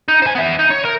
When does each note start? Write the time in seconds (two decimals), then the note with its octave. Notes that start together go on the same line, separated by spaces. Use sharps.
0.08 D#4
0.22 C5 G#5
0.35 B3 E5
0.59 D#4
0.70 C#5
0.85 A#4